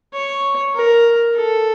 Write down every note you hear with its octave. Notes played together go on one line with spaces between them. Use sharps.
C#5
A#4
A4